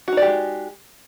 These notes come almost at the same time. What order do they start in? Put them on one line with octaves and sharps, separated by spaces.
F#4 D#4 D5 G4 G#3